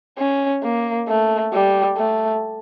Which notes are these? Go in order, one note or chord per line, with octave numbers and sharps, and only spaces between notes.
C#4
A#3
A3
G3
A3